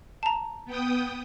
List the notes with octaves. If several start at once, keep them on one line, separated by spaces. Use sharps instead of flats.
A5 A#5
B3 G5 D#6